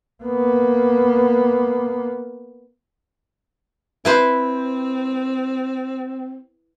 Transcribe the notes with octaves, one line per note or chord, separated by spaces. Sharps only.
A#3 B3
C4 E4 B4 C5